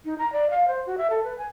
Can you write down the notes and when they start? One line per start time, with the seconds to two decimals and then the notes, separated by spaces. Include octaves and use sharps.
0.05 D#4
0.18 A#5
0.33 D5
0.50 F5
0.68 C5
0.86 F#4
0.98 E5
1.10 A4
1.24 B4
1.38 G#5